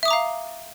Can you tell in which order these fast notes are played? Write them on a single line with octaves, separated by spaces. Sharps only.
E5 D#6 D6 A#5 F5